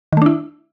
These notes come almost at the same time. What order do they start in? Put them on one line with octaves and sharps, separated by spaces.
D#3 A3 D4 E4